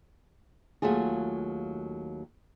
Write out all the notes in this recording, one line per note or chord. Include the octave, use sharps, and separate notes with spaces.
D#2 F#3 A3 F4 G#4